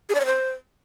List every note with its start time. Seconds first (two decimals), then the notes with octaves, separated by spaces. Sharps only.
0.09 G#4
0.15 D5
0.20 C#5
0.26 C5